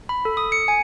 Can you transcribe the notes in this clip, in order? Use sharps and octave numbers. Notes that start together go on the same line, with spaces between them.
B5
A4
D#6
C#7
G#5